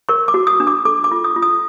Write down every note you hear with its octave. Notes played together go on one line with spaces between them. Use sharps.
A#4 C#6
D6
F#4
D#6
D4
D6
A4 D6
D6
F4
D#6
F4
D#6